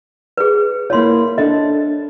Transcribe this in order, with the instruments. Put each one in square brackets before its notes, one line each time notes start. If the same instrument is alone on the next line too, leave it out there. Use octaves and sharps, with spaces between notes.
[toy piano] G#4 B4
[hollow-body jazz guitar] A#3 E4 F4 [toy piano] C#5 C6
[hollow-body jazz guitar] D4 A4 E5 [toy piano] D#5